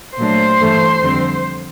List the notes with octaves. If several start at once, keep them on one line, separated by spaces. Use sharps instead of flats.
A#2 F#3 A3 D4 C5 C6
G2 E3 A3
F2 D3 G3 C4